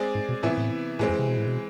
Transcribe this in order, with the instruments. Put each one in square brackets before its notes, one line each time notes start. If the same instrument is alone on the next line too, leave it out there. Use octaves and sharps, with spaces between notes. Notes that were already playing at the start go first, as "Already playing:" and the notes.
Already playing: [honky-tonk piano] G#3 C4 G#4 D5
[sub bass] G#2
B2
[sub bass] A2 [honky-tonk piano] C3 E3 B3 E4
[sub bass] A2
[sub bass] A2 [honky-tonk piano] E3 G#3 C4
[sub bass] F2
C3
B2
A2
B2